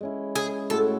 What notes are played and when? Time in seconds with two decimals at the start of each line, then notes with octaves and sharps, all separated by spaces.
0.01 G#3 C#4 E4
0.36 G#4
0.70 A2 G#3 C#4 F#4 A4